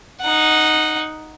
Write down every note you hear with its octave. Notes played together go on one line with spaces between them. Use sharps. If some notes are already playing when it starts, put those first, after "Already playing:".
D#4 F#5